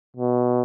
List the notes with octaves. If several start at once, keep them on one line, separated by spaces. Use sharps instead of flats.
B2